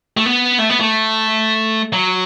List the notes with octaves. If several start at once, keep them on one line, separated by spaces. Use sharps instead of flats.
A3
B3
A3
B3
A3
F#3